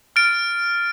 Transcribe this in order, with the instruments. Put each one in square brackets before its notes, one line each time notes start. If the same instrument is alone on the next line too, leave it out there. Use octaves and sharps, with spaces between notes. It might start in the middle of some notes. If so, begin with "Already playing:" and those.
[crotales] F6 A6 D7